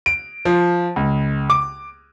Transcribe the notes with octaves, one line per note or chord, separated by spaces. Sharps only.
D7
F3
C#2
D6